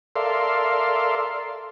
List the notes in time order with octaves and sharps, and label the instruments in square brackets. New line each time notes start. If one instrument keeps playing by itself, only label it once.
[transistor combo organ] A4 A#4 D5 E5 F5 C6